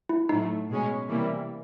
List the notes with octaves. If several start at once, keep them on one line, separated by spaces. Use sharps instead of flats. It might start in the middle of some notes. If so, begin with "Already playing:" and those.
E4
A2 F#3 A3 D#4
B2 G#3 C#4
C3 E3 G3 A#3